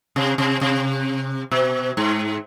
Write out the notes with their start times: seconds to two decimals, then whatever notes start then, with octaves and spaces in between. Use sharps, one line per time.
0.16 C3
0.38 C3
0.61 C3
1.51 B2
1.97 G#2